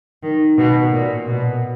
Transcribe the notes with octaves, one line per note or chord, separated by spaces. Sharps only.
D#3
B2
A#2
B2